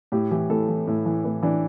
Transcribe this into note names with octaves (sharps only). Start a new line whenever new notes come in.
A2 G4
E3 G4
A2 A4
E3
A2
E3
A2 B4
E3 D4